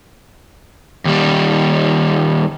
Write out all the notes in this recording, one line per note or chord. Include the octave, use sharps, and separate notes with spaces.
D#2 G3